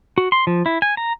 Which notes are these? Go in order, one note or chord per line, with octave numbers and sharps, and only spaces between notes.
F#4
C6
F3
E4
G#5
A#5